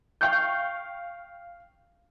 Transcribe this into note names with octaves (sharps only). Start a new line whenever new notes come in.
F5 G5 C#6 G6